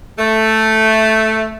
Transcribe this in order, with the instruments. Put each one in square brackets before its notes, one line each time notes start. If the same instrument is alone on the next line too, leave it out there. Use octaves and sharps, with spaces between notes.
[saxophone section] A3